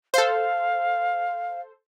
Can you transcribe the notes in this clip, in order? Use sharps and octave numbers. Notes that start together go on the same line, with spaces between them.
A4 C5 F5